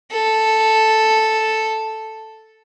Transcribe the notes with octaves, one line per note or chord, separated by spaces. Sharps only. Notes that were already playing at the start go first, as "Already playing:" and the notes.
A4